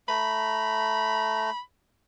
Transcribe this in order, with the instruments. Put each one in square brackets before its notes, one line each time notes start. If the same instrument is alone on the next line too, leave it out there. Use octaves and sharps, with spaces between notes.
[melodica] A3 A#5 [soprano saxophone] B5